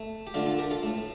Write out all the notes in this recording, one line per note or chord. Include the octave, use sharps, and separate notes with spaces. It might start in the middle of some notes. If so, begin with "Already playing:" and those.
Already playing: A3
G4
D3 A3 D4 F4
F4 A4
G4 A#4
F4 A4
A2 A3